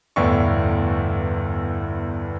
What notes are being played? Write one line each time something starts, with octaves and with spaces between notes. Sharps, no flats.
G1 E2 A2 D5 C#6